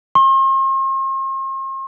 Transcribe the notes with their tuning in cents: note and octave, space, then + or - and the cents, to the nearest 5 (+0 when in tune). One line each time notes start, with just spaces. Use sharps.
C6 +45